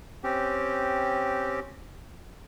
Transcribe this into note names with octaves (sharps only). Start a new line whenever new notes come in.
C4 C#4 G4